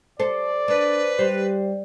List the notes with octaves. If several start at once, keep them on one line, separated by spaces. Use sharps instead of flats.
A4 C5 D5
D4 B4
G3 C5